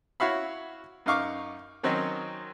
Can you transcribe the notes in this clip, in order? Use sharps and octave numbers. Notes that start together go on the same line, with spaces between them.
E4 F#4 C#5 E5 F5 B5
F#2 D#4 F5 C#6 D6
D#3 F#3 C4 C#4 D#4